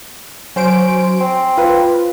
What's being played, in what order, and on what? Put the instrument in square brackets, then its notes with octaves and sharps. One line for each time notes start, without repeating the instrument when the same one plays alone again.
[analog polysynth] F#3 C5 D7 [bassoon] C#4
[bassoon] C4
[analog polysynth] F4 B4